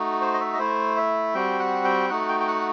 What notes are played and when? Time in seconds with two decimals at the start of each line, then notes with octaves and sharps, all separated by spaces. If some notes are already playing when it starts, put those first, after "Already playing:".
Already playing: A3 D#4 F#4
0.21 C5
0.34 D#5
0.40 E5
0.53 D#5
0.59 A3 E4 C5
0.97 E5
1.34 G3 C4 F#4 G5
1.59 F#5
1.84 G5
2.09 A3 D#4 F#4 F#5
2.29 G5
2.40 G5
2.47 F#5